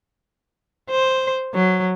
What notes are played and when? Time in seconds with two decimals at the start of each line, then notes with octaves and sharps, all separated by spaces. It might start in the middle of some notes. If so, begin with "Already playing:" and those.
0.91 C5
1.54 F#3